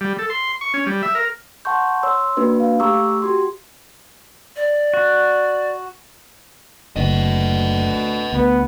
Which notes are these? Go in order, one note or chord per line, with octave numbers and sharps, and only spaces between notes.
G3
A4
C6
C#6
C#4
G3
E5
A#4
F#5 A5 C6 C#6 G6
C#5 C6 E6
A#3 D4 F#4 B4
F5
A3 G4 A#5 C#6 D6 E6
F#4 G4 C6
D5
F#4
F#1 D2 B4 D#5
D2 B3